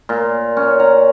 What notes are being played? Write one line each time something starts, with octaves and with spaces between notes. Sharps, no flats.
A#2
C#4
A#5